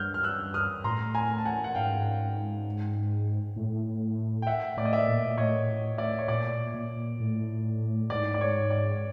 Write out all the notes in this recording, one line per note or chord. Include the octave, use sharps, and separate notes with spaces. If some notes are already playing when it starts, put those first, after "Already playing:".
Already playing: G2 F6 G6
F6
E6 F#6
D#6 F6
A2 A#5 C6
G#5 A#5
A5
F#5 G#5
F#5
G#2 F5 G5
A2
G5
E5 F#5
A2 D5
D#5
D5 E5
A#2
A2 C#5 D#5
D5 E5
C#5
A#2 D5
A#2
A2
G#2 D5
D5
C#5
D5